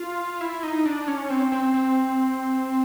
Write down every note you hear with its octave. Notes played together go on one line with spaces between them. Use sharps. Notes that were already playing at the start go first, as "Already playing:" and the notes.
Already playing: F4
E4
D#4
D4
C#4
C4
C4
C4